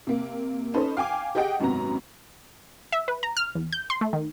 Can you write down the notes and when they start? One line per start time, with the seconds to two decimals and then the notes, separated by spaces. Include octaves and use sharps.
0.07 C3 A#3
0.74 C#4 D#4 A4 B4 C5
0.97 F5 G5 G#5 D6
1.35 G4 G#4 D#5 F#5 G5
1.59 G#1 F#2 C3 B3 A#5
2.92 E5
3.08 B4
3.23 A#5
3.37 F6
3.55 E2
3.73 G6
3.90 C6
4.01 A3
4.13 D#3